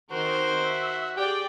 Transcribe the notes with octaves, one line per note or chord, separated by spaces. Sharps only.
D#3 C4 F#4 A#4 C5
E5
G4 G#4 D5 G5